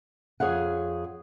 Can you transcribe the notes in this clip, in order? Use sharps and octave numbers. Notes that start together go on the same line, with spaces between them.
F2 G#4 C#5 F5 F#5